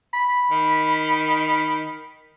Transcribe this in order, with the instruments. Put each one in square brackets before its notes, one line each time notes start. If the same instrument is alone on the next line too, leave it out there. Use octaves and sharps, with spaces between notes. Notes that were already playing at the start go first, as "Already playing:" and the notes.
[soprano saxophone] B5
[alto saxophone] D#3